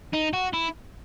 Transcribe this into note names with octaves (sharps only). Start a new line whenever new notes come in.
D#4
F#4
E4